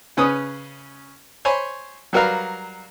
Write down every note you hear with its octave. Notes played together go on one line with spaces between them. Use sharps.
C#3 C#4 B4 D#6
C5 C#5 G#5 B5
F#3 G3 F#4 A#4 B4 F5